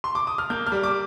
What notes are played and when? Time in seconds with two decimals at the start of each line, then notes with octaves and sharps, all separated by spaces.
0.04 C6
0.15 D6
0.27 D#6
0.38 F6
0.50 A#3 G6
0.67 F6
0.72 G3
0.83 D6